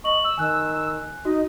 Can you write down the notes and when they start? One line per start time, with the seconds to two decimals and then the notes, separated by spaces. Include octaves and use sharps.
0.04 D#5 C#6 F#7
0.24 E6
0.38 D#3 G#5 F#6
1.25 D#4 F#4 D#5